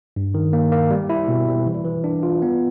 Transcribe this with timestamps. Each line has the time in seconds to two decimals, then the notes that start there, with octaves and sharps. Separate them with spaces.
0.16 G2
0.34 D#3
0.53 A#3
0.72 A#3
0.91 G3
1.10 E4
1.28 B2
1.48 G3
1.66 E3
1.85 E3
2.04 D4
2.23 F4
2.42 B3